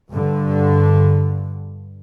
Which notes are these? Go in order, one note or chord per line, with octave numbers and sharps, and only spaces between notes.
G2 D3